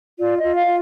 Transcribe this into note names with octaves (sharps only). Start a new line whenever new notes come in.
F4 D5
D#5
F4
F5
F4